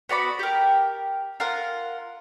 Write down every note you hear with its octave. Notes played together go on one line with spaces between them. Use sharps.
B3 F#4 D5 B5
G4 A#4
F4 A#4 F#5